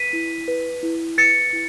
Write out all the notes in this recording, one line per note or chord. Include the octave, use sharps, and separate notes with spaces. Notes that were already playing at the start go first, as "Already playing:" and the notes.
Already playing: B4 B6 D#7
E4
B4
E4
B4 A6 C#7
E4